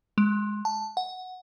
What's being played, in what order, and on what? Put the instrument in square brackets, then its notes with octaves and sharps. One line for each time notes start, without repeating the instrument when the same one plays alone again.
[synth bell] G#3
A5
F#5